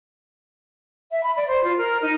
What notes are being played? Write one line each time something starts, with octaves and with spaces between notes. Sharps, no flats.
E5
B5
D5
C5
F4
A#4
D#4